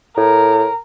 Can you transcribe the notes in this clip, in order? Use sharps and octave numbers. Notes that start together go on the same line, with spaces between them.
A2 A#4